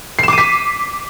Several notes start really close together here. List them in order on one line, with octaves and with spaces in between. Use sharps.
C7 E7 D6 D#7 B6